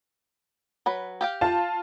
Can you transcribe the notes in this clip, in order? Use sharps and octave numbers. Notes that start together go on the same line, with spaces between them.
F#3 B4 B5
G4 F5 G5
F4 A5